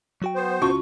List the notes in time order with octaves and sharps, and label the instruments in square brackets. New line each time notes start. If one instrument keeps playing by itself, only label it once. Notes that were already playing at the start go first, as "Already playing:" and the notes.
[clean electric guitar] F#3 F#4 G5
[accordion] B3 C5
[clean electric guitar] C#2 F4 [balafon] C#4 F#4 [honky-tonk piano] C#6